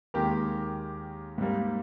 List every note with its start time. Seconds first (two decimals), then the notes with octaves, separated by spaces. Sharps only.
0.14 D#2 D#3 G#3 G4 A#4
1.38 G#2 G3 A#3